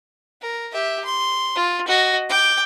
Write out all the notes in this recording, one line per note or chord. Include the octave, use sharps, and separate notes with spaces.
A#4
G4 E5
C6
F4
F#4 D#5
G5 D6